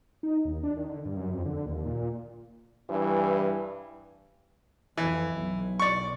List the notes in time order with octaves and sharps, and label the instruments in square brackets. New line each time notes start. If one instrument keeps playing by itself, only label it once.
[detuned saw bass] D#4
D#2
D4
D#3
D3
G2
F#2
F2
D3
D#2
A#2
[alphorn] G2 [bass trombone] E3
[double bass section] F2 [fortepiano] E3
[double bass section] B1
[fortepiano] D5 C#6